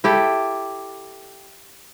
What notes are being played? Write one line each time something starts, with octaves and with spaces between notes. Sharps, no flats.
E4 G4 A4